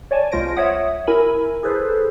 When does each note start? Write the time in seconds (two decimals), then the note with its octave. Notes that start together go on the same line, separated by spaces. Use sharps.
0.11 C#5 D5 G#5 A5
0.32 C2 G#3 F4 C5 A#6 D7
0.57 C#5 E5 F#5 D#6
1.07 E4 A#4 G#5 B5
1.63 G#4 A4 B4 C5